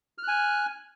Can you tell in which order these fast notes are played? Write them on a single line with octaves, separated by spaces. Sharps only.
F6 F#6 G#5